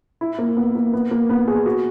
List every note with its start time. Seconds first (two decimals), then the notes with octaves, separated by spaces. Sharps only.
0.21 E4
0.38 A#3
0.57 B3
0.75 A#3
0.93 B3
1.11 A#3
1.29 B3
1.48 G#4
1.66 F#4